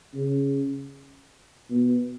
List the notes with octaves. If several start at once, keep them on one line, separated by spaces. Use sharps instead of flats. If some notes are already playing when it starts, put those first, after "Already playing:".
C#3
B2